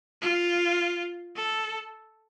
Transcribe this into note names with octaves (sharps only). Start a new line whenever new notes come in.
F4
A4